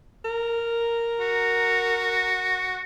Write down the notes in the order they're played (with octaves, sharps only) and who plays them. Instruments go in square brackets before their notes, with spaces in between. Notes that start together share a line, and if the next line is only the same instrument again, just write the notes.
[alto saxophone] A#4
[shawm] F#4